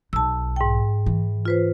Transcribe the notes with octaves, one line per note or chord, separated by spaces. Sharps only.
B1 A5 E6
G#2 G5
E3
F4 B4 C5